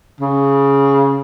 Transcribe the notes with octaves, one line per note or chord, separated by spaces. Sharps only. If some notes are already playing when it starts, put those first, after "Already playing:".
C#3